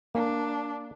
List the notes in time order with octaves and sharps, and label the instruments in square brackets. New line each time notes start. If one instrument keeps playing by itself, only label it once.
[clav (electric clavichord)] A#3 [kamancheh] D4